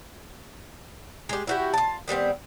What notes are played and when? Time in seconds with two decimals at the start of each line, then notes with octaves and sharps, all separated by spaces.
1.29 G#3 G4
1.47 E4 F#4 G4
1.74 F4 A5
2.08 D#3 G3 B3 C4